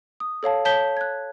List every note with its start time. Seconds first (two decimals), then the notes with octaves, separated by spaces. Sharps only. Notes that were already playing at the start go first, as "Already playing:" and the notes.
0.20 D#6
0.43 A4 C#5 F5 A5
0.65 C#5 A5 G6 B6 G7
0.97 F#6 G#6